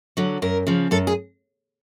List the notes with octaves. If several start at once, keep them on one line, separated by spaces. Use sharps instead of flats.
D3 F#3
F#2 A#4
C#3 F3
F#2 A4
G#4